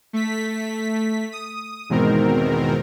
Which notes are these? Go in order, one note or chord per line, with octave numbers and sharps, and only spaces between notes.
A3 B6
D#6
E2 G#2 B2 D#3 C4 A#4